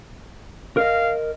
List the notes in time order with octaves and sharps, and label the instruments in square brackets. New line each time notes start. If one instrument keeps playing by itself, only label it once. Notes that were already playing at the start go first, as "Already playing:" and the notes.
[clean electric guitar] A#4 D#5 [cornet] F5